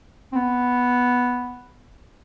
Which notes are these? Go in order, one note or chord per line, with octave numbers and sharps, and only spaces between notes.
C4
B3